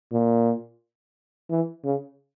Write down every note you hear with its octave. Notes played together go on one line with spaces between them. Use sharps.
A#2
E3
C#3